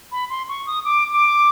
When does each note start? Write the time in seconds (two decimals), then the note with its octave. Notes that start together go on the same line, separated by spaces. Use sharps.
0.12 B5
0.30 C6
0.49 C#6
0.67 D#6
0.85 D6
1.13 D6